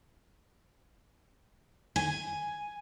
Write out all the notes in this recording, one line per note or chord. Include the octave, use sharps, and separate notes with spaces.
G#5